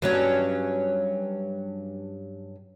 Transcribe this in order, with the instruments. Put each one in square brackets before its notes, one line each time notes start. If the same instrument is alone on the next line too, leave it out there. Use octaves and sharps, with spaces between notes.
[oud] G2 F#3 C#4